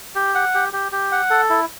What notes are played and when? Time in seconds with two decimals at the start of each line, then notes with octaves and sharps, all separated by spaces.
0.15 G4
0.35 F#5
0.54 G4
0.73 G4
0.92 G4
1.12 F#5
1.30 A4
1.50 E4